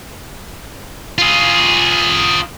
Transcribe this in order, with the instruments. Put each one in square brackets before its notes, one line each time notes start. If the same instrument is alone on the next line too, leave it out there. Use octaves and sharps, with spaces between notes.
[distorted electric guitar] F4 G#4